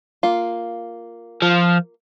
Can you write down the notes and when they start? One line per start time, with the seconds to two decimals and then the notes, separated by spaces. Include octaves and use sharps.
0.23 A#3 F4
1.42 F3